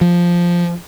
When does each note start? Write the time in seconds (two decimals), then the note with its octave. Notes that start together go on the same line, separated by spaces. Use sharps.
0.01 F3